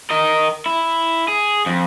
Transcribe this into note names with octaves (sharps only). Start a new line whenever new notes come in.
A#4 D#5
E4
G#4
F2